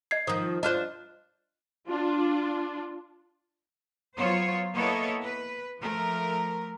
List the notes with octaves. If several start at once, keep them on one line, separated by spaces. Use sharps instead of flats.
D#5 G#6 C7
D#3 F3 C5 D#6
D4 F4 C5 D#5 F6 F#6
D4 F4
F#3 B3 F4 C5 C#5
A#3 B3 E4 A4 C#5 D#5
B4
F3 A3 A#4